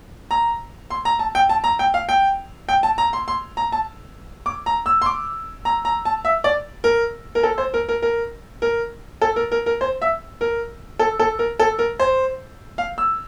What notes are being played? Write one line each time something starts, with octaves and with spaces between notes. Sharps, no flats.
A#5
C6
A#5
A5
G5
A5
A#5
G5
F5
G5
G5
A5
A#5
C6
C6
A#5
A5
D6
A#5
E6
C6
D6
A#5
A#5
A5
E5
D5
A#4
A#4
A4
C5
A#4
A#4
A#4
A#4
A4
A#4
A#4
A#4
C5
E5
A#4
A4
A4
A#4
A4
A#4
C5
F5
E6